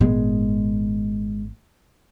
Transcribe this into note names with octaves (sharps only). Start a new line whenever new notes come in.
G#1 A#2 D#3 G#3 B3